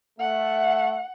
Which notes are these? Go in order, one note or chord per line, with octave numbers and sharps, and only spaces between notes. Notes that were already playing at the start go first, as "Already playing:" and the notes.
A3 E5 F#5